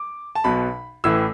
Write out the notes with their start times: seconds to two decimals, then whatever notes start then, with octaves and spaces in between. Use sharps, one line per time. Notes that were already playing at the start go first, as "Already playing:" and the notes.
Already playing: D6
0.35 A5
0.44 B1 B2 F#3 B5
1.04 A1 A2 E3 E6